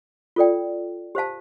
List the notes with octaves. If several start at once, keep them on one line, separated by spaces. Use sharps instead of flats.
F4 A4 D5 G5
G4 C5 F5 A5